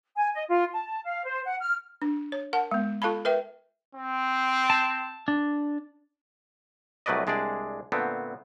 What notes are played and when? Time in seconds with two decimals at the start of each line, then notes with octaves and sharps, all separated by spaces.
0.16 G#5
0.33 D#5
0.49 F4
0.73 A5
1.04 F5
1.25 C5
1.46 F#5
1.61 F6
2.02 D4
2.32 C#5
2.53 A#4 F#5 A5
2.71 G#3 B3
3.02 F4 A4 F5 A5 B5
3.25 A#4 B4 E5 G5
3.95 C4
4.70 A5
5.28 D4
7.06 C2 F#3 A3 B4 D5 D#5
7.27 C2 G#3 D4 G#4 D5
7.92 A#2 D3 A3 B3 C4